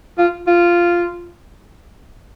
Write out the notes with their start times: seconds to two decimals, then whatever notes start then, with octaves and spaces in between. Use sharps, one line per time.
0.18 F4
0.47 F4